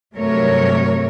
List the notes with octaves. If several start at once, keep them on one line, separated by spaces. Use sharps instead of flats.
G2 C3 F#3 A3 A#4 C#5